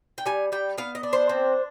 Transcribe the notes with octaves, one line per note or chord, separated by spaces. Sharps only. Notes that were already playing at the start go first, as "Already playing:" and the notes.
G5
G3 G#5
G3 G5
B3 F5
D#5
D4
C5
C4